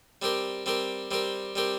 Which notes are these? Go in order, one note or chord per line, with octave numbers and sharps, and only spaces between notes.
G3 C4 G4 A#4
G3 C4 G4 A#4
G3 C4 G4 A#4
G3 C4 G4 A#4